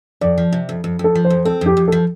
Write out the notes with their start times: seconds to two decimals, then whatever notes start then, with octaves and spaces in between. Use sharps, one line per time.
0.21 F2 D5
0.38 F3
0.52 C3
0.69 F2
0.84 F2
0.99 F2
1.04 A4
1.15 F3
1.25 C5
1.30 F2
1.45 C4 A4
1.61 F2 G4
1.77 F2
1.88 F3 A4